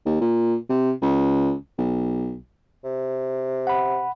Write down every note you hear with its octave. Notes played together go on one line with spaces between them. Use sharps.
D#2
A#2
C3
C#2
B1
C3
F#5 B5